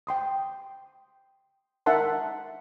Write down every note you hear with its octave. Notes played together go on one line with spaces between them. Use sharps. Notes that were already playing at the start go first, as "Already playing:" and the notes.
G5 C6 D#6
D#4 A#4 E5 F#5 A5 C6